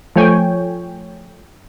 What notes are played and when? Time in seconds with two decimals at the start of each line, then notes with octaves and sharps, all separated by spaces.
0.16 F3 A3 C#5 G5 G#5